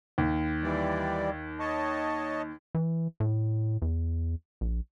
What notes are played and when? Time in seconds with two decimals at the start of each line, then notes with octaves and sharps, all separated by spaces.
0.18 D#2
0.63 E3 G3 D5
1.59 C#5 D#5 A5
2.75 E3
3.20 A2
3.82 E2
4.61 A#1